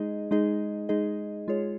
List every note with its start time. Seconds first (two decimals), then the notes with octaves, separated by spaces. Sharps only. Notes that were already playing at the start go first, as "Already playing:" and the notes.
Already playing: G#3 D#4 G#4 D#5
0.31 G#3 D#4 G#4 D#5
0.89 G#3 D#4 G#4 D#5
1.48 G#3 F4 G#4 C#5